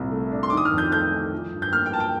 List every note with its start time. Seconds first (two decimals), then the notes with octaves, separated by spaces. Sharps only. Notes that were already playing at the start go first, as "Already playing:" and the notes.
Already playing: C2 A#2
0.11 A3
0.31 D4
0.43 C6
0.50 D#3 D6
0.57 D#6
0.65 F6
0.72 F2
0.78 G6
0.92 A3 G6
1.13 D#4
1.32 F3
1.52 G2
1.62 G6
1.72 A#3 F6
1.86 G5
1.93 F4 A5
2.00 G5